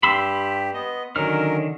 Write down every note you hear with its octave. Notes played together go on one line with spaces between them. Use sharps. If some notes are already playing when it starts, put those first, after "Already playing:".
G2 G4 B5 C6 E6
B3 D#5
D3 D#3 F#3 C#4 A#4 F6